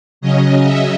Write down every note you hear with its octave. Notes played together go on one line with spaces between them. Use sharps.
C#3 F#3 C#4 D#5
E5